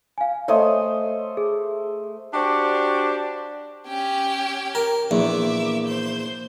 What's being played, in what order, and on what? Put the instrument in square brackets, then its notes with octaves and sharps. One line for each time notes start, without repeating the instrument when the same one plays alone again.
[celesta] F5 G#5
[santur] A3 C5 D#6 [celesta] C#5 D#5
[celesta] G#4
[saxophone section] D4 F#4 G4 C5 D5
[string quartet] C#4 G4 G5
[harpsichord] A#4
[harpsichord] A#1 E2 [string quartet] E5 D6
[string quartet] C5 G6